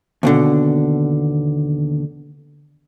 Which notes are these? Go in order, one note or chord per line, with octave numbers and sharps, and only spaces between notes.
D#2 B2 D3